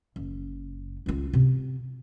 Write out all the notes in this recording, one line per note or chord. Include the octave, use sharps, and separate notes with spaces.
F#1
C#2 F4
C3